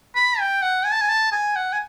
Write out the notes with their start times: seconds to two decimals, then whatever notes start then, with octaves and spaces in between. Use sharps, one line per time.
0.15 B5
0.40 G5
0.62 F#5
0.85 G#5
0.93 A5
1.01 G#5
1.09 A5
1.32 G#5
1.56 F#5
1.73 G#5